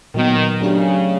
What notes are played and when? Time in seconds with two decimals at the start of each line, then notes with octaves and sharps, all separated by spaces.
0.14 A#2 D#3 F#3 B3
0.60 C#3 F#3 A3 D4 G4